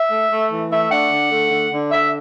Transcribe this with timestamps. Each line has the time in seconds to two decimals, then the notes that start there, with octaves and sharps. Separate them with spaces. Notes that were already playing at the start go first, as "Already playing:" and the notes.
Already playing: E5
0.09 A3
0.30 A3
0.50 E3
0.70 A3 E5
0.90 D4 F#5
1.10 D3
1.31 A3
1.51 D3
1.71 D3
1.91 D3 E5